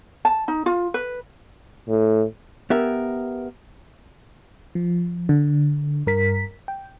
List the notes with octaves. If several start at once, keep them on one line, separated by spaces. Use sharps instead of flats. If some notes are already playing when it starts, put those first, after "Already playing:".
A5
D#4
F4
B4
A2
B3 G4 A#4 E5
F3
D3
G2 A#4 B6
G5